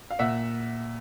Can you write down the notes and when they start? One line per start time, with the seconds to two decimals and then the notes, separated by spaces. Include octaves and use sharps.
0.10 F5
0.19 A#2 E5 F#5